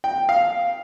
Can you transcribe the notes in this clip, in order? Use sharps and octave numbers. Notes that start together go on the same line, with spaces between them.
G5
F5